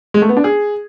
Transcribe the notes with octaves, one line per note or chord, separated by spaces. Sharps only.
G#3
A3
B3
D4
G#4